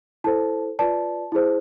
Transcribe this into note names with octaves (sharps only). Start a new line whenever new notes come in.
E4 A4 C5 A5
F4 B4 D5 A5
E4 G#4 C5